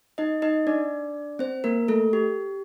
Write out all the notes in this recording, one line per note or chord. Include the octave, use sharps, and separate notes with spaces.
D#4 D#5
D#4 D#5
D4 D5
C4 C5
A#3 A#4
A3 A4
G4